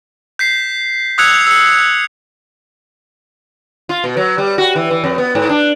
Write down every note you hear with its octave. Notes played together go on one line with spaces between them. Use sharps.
G6 B6 C7
D#6 E6 F#6 G#6 C#7 F7
E6 C#7
F4
B2
F#3
G3
F#4
E3
E3
F2
B3
G#2
D4